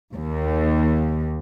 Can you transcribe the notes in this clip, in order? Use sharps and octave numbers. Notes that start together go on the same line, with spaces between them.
D#2